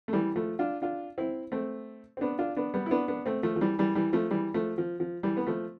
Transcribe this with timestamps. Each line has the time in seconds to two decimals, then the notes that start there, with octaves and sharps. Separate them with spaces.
0.08 A3
0.13 E3 G3
0.36 F3 A3
0.59 D4 F4
0.82 D4 F4
1.18 C4 E4
1.52 A3 C4
2.17 C4
2.21 B3 D4
2.39 D4 F4
2.57 B3 D4
2.74 G3 B3
2.86 E4
2.91 B3 D4
3.08 B3 D4
3.26 A3 C4
3.43 F3 A3
3.56 F3
3.61 E3 G3
3.79 E3 G3
3.95 E3 G3
4.13 F3 A3
4.31 E3 G3
4.54 F3 A3
4.78 F3
5.00 F3
5.23 E3 G3
5.37 B3
5.47 F3 A3